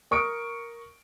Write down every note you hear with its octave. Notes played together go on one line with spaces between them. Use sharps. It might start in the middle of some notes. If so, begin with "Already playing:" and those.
A#4 C#6 D#6 D7